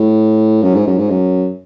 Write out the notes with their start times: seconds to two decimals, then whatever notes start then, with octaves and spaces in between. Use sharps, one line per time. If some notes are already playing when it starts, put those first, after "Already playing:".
Already playing: A2
0.63 F#2
0.75 G#2
0.87 F#2
0.98 G#2
1.10 F#2